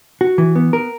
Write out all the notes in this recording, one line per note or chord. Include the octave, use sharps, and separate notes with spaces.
F#4
E3
B3
A#4